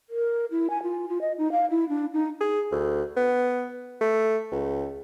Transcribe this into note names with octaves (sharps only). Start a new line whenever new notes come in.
A#4
E4
G#5
F4
F4
D#5
D#4
F5
E4
D4
D#4
G#4
D2
B3
A3
C#2